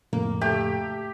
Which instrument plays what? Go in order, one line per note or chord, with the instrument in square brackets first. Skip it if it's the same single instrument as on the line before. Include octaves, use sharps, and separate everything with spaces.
[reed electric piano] F2 A2 C#3 [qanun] A#3
[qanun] A3 [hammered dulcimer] G4